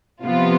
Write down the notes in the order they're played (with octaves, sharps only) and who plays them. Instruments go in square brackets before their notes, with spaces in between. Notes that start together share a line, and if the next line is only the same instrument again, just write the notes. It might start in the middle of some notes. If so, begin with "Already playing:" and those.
[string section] C3 F3 B3 F4